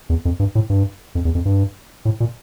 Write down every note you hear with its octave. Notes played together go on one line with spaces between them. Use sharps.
E2
F2
G2
A2
G2
F2
E2
F2
G2
A2
A#2